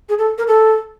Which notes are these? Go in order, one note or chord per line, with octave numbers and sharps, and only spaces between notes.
G#4
A4
A#4
A4